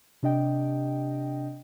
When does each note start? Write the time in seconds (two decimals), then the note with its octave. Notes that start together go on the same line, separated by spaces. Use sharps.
0.23 C3 D4 D#5 G5